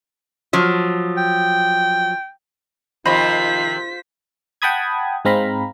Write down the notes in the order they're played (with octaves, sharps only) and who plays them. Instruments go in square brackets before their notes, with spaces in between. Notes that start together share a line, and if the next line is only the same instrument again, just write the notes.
[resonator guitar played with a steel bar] F3 F#3
[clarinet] G5
[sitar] C3 D#3 F3 [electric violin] F4 B6 [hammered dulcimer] C5 [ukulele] D#5 B5
[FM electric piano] F#5 G5 A5 B5 D#6 G#6
G#2 G#3 C4 F5 A#5 B5